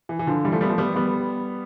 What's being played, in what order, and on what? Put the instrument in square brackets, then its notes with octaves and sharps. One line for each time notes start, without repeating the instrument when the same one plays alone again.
[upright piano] E3
E3
D3 F3
E3 G3
F3 A3
G3 B3
F3 A3
G3 B3
G3 B3